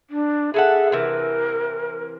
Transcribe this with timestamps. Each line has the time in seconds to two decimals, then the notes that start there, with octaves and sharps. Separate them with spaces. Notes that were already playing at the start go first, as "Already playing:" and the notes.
0.10 D4
0.54 G#4 A4 E5 F#5
0.92 C3 E3 A#4